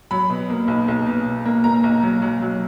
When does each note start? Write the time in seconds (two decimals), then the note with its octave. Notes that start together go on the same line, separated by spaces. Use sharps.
0.11 F#3 B5
0.30 B2
0.50 A#3
0.68 B1
0.88 B1
1.06 B2
1.25 B2
1.45 A#3
1.64 A#3 A#5
1.84 B1
2.03 F#3
2.22 F#3
2.42 F#3